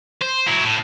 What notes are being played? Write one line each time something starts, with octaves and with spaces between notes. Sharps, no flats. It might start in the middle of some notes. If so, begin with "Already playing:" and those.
C5
F#3 E4
A2